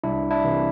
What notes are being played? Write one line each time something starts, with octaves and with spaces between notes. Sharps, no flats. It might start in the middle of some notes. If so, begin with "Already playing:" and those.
C2 D4 E4
D4 E4
C3 E3